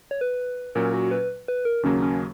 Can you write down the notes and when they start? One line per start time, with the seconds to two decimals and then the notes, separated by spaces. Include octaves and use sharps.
0.11 C#5
0.21 B4
0.75 A#2 F#3 C#4 A#4
0.94 F#4
1.11 B4
1.48 B4
1.65 A#4
1.83 D#2 C#3 F#3 A#3 C#4
2.02 C#4